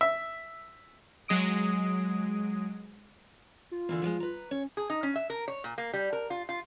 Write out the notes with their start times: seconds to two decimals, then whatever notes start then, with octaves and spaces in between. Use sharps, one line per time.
0.01 E5
1.28 F#3 G#3 D#6 D7
3.71 F4
3.89 D3 E3 A#3
4.02 F3 F#3 G#3
4.20 B4 A#5
4.51 C#4 C#5
4.77 G#4
4.90 D#4
5.03 C#4
5.16 E5
5.30 A#4
5.48 C#5
5.64 A#2
5.78 A#3
5.94 G3
6.13 A#4
6.30 F4
6.49 F4